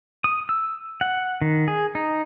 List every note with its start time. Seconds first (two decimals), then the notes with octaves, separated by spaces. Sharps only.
0.24 D#6
0.49 E6
1.01 F#5
1.42 D#3
1.68 G#4
1.95 D#4